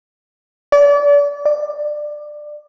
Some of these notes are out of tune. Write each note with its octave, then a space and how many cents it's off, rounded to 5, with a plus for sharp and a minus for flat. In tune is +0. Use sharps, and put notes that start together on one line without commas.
D5 -35
D5 +20